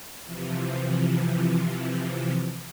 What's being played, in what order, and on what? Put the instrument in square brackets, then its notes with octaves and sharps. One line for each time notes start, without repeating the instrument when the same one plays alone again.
[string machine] C3 E3 F3